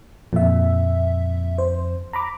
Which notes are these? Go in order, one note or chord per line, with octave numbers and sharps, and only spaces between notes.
F2 A#2 E5
C5
A#5 B5 D6